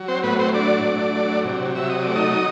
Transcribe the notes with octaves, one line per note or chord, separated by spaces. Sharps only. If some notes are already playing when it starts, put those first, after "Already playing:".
Already playing: F#3
C4 C5
A2 B3 B4
C4 C5
F#3 D4 D5
A2
F#3
C3
F#3 E5
D#5
A3 D5
D#4 D#5